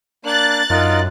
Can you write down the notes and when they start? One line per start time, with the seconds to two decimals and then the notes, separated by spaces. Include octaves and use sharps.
0.25 A#3 D4 F#6 A6
0.70 F#2 D#4 F4 A#4